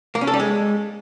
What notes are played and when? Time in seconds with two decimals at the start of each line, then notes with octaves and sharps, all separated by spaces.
0.15 A#3
0.21 C#4
0.27 A4
0.34 G3
0.40 G#3